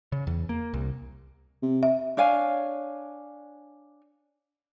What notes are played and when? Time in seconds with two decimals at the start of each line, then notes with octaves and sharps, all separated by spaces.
0.12 C#3
0.27 E2
0.49 A#3
0.74 C2
1.62 C3
1.83 E5
2.17 D4 C#5 F5 G#5